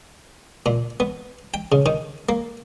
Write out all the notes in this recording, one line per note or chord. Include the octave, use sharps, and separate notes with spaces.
A#2
B3
G5
C#3
D#3
A#3